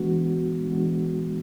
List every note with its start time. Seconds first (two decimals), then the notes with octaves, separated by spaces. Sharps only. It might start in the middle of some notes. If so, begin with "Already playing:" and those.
Already playing: E3 G#3 B3 D4 F#4
0.70 E3 G#3 B3 D4 F#4